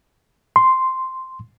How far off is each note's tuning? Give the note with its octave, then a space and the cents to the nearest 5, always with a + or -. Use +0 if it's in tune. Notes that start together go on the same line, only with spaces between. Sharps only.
C6 -5